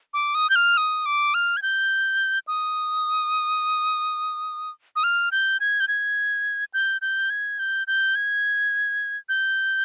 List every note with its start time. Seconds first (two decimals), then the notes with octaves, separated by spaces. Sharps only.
0.14 D6
0.35 D#6
0.50 G6
0.56 F6
0.77 D#6
1.06 D6
1.34 F6
1.57 G#6
1.62 G6
2.47 D#6
4.96 D#6
5.04 F6
5.32 G6
5.60 G#6
5.80 G6
5.88 G#6
6.74 G6
7.02 G6
7.30 G#6
7.59 G6
7.87 G6
8.15 G#6
9.29 G6